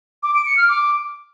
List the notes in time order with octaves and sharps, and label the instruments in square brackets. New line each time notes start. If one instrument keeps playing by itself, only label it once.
[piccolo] D6
D7
C#7
F6
D6